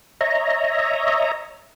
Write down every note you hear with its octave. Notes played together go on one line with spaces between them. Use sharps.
C#5 D#5 E5 A#5